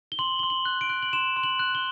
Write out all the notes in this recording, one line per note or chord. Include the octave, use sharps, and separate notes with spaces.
G7
C6 F#7
C6 G7
F#7
F#6
D7
F#6
F#7
C6 E7
C6
F#7
F#6
G7